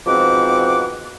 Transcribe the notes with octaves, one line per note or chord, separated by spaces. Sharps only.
G#2 B2 F3 C4 F#5 D6